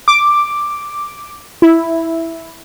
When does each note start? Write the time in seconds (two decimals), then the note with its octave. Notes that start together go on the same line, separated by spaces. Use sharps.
0.08 D6
1.62 E4